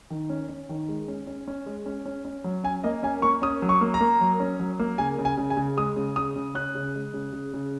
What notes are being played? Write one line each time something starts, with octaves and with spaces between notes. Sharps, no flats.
D#3
C#4
C#4
D#3
G#3
C#4
C#4
C#4
G#3
C#4
C#4
C#4
F#3
C#4 G#5
A#3 D#5
C#4 G#5
A#3 C#6
C#4 D#6
F#3
C#6
A#3
A#5
A#3
F#3
C#4
F#3
A#3
C#3 G#5
C#3
G#5
C#3
G#5
C#3
G#3 D#6
C#3
C#3 D#6
C#3
C#4 F#6
C#3
G#3
C#3
C#3
C#3